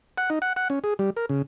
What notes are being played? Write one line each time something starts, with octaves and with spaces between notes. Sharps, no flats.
F#5
D#4
F#5
F#5
C#4
G#4
G3
A#4
C#3